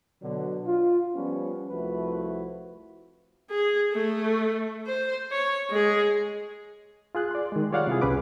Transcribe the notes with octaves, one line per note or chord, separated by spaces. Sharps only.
B2 D3 F#3
F4
F3 G3 B3 C#4
C2 F3 A3 E4 F#4 B4
G#4
A3
C5
C#5
G#3 G#4
F4 G#4 F#6
D5 C6
D#3 G#3
G3 F4 C#5 D5 F5 F#5
C3 E4 F4 G#4
C2 C#3 C#4 B4 D6